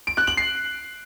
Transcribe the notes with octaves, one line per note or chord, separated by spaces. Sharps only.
D7
F#6
F#7
C7